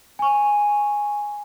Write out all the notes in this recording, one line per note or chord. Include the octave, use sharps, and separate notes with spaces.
G#5 C#6